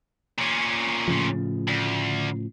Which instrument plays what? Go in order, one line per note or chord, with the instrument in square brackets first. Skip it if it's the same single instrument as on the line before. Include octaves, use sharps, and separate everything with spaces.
[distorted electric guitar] A#2 C#4
[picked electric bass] A2 C#3 F3
[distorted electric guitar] D2